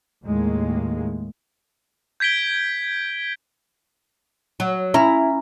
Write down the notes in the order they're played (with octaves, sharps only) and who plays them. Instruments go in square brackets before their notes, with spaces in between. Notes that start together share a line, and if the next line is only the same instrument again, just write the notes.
[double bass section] D#2 A2 D#3 G#3 A#3
[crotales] G6 G#6 B6 D7 G7
[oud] F#3
[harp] C#4 A#5 [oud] E4